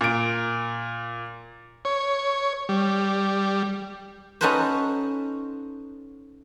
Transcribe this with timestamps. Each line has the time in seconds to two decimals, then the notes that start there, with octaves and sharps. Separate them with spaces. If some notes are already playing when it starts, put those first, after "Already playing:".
0.01 A#2 D7
1.85 C#5
2.69 G3
4.41 C#4 D#4 F#4 A4 B4 C5